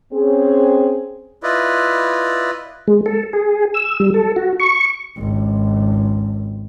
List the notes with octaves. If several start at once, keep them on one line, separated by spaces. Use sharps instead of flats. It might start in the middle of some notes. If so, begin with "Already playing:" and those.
C4 C#4 G#4
E4 F4 B4 D5 D#5
G#3
A4
G#4
E6
G3
A4
F#4
C#6
G#1 C#2